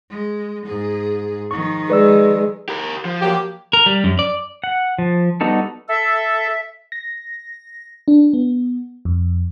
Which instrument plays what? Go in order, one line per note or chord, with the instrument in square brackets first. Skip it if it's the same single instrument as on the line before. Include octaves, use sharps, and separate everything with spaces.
[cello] G#3
G#2 G#4
[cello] D#3 F3 [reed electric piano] C#6
[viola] G#3 [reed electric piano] B4 D5 E6
[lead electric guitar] G4 A#4
F3
[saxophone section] F#3 A#3 G4
[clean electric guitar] A#4
G3
F#2
D5
[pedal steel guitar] F#5
F3
G3 B3 D#4 F#4 A4
[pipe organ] A4 [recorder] E5
[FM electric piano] A#6
D4
B3
F2